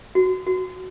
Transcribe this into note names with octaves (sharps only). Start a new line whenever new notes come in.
F#4
F#4